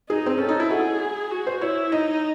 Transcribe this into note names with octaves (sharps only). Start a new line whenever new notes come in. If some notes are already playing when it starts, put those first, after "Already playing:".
D#4 G#4
C4
C#4 A4
D#4
E4
F#4 G#4
F#4
C5
E4 C#5
D#4 D#5